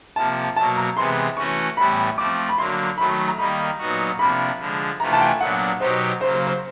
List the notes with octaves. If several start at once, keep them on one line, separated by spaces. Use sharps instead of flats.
C3 F3 A#3 A5
B2 F#3 A#3 A5
A#5
C3 E3 G#3 B3 C6
E3 A3 C#4 F#4 C#6
A2 E3 G3 B3 E4 B5
F3 A3 C4 D6
B5
D3 F#3 A#3 C6
D#3 F#3 A3 B5
A#5
D#3 G3 A#3 D#4 B5
A#2 F#3 B3 D#4 F#4
C3 F3 A#3 D4 B5
D3 F3 G#3
C3 E3 A3 D4 F4 A#5
A5
G5
G#5
A#2 F#3 B3 D4 F#5
B2 F#3 B3 D#4 G4 C5
C#3 F#3 A#3 C5
C5
C5